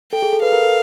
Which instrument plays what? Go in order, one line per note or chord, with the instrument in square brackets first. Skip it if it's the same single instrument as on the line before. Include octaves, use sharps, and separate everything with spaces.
[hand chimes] A4 [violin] G5
[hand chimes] G#4
A4
[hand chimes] B4 [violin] F5
[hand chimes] A#4
A4